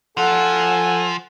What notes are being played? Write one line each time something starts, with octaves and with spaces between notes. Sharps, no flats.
F3 A4 F#5 G#5